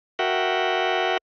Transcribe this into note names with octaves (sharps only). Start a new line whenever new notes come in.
F#4 A#4 E5 F#5 G5